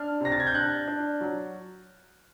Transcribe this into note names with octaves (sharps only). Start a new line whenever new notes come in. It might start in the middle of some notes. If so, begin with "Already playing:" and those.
Already playing: D4 F6
C3 A#6
A6
G#6
G6
D4 F#6
D4
F#3